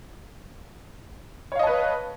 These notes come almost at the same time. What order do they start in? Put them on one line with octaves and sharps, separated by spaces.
C#5 F5 D#5 A5 B4